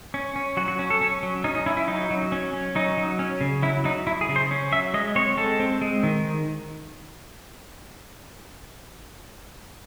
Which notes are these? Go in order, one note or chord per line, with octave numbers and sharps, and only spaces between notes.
C#4
C#4
F#3 F#4
F#4
C#4
A4
C#4
F#3
C#4 D#4
D#4
C#4 E4
E4
F#3 D#4
F#3
C#4
C#4
F#3 D#4
F#3
C#4
C#3
F#3 E4
F#3 D#4
F#3 E4
G#4
C#3
C5
C#4
F#3 E5
G#3 D#5
C4 C#5
G#3 A4
C4
G#3
D#3